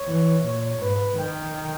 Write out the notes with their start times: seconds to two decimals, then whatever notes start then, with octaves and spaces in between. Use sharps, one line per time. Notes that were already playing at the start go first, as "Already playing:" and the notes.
Already playing: C#5
0.08 E3
0.45 A#2 C#5
0.81 G#2 B4
1.18 D#3 G5